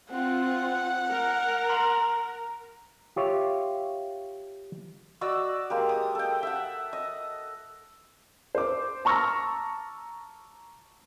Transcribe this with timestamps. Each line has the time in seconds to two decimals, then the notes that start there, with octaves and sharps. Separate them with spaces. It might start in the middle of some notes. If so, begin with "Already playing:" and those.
0.10 C4 F4 F#5
1.10 A#4
1.69 A#5 C6
3.16 F4 G4 C#5 E5
5.21 F#4 D5 D#5 E6
5.70 G#3 A#3 G4
5.89 D#6
6.15 A4 G5
6.43 E5 F#5
6.93 D#5
8.55 C5 D6
9.05 A5 A#5 C#6 E6 F6 A#6